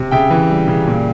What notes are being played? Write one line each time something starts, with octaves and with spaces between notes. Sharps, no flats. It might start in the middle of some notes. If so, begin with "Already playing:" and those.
Already playing: C3
C#3 E5 G5
E3
G3
C#3
A#2